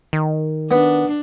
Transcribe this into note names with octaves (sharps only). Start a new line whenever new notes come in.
D#3
B3 D4